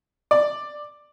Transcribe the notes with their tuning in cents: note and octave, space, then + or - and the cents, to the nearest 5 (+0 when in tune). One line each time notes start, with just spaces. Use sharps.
D5 +10